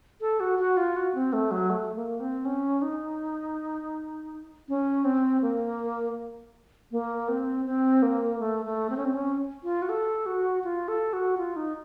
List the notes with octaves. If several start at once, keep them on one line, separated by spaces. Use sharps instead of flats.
A4
F#4
F#4
F4
F#4
C4
A3
F#3
A3
A#3
C4
C#4
D#4
C#4
C4
A#3
A#3
C4
C4
A#3
A3
A3
C4
C#4
C4
C#4
F4
F#4
A4
F#4
F4
A4
F#4
F4
D#4